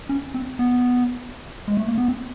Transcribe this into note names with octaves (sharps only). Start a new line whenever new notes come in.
C#4
C4
B3
G#3
A3
A#3
B3
C4